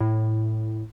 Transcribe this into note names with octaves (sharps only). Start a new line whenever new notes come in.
A2